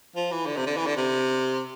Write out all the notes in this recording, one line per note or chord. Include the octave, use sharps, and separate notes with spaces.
F3
E3
D3
C3
D3
E3
D3
C3